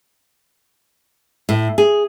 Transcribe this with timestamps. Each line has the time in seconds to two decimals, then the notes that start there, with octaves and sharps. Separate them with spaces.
1.49 A2
1.78 G#4